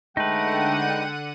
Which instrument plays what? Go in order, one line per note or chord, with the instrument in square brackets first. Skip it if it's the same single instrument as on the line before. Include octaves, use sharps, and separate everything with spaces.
[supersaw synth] D3 F#5 D#7 [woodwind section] G#3 G5 [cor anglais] A3 [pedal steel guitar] D#4 B4